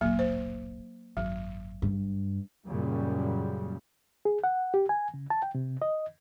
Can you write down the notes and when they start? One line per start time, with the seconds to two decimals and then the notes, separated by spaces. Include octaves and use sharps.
0.01 D1 G1 A#2 F#3 A#3
0.19 C5
1.17 G#1 F#2 F#3
1.82 G2
2.69 F#2 A#2 C#3 G3
4.25 G#4
4.44 F#5
4.74 G4
4.89 G#5
5.14 C#3
5.30 A5
5.42 G5
5.55 C3
5.82 D#5